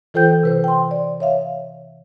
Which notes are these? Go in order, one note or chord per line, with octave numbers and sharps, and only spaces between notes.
E3 F4 A4 C5 G5 G6
C3 B4 C5
G5 C6
D5
C#5 E5 F5